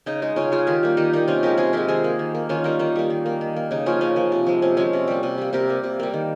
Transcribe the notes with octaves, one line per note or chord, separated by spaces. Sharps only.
C#3 D#4
G#3 D#4
C#3 C#4 F4
G#3 F4 G#4
D#3 G4 A#4
G3 A#3
D#3 D#4 G4
G3 A#3 D#4
C3 C#4 F4
F3 G#3 G4 A#4
C3 F4 G#4
F3 G#3 G4 A#4
D#3 G#4 C5
A#3
D#3
A#3
D#3 C#4 F4
G3 A#3 D#4
D#3 D#4
G3 A#3
D#3
A#3
D#3
A#3
C#3 D#4
F3 A#3 C#4 F4
C#3 C#4
F3 A#3
C3
F3 G#3
C3 C#4
F3 G#3 C#4
C3
G3 A#3
C3
G3 A#3
C3 G4 A#4
G3 A#3
C3
G3 A#3
D#3